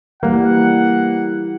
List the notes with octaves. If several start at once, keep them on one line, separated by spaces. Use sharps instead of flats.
E3 G3 A#3 F#5